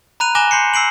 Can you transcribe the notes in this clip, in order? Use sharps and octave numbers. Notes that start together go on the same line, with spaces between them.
A#5 B5 F#6 D#7 F7
G#5 D6 F#6 A#6 E7 G7
C6 G6 C7 C#7
E6 C7 D7 F#7